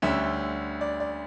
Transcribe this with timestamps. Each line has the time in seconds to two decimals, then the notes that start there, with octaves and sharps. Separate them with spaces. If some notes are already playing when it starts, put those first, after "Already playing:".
0.02 D2 D3 G3 C#4 E5
0.81 D5
1.00 D5